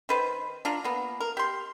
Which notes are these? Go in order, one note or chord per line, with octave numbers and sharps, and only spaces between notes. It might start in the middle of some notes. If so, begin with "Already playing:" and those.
D#3 B4 C5
D4 F4 A#5
A#3 B3
A#4
G4 C6